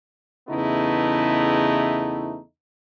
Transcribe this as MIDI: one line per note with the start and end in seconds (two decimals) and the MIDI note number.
0.50 2.38 40
0.50 2.38 49
0.50 2.38 57
0.50 2.38 59
0.50 2.38 63
0.50 2.38 64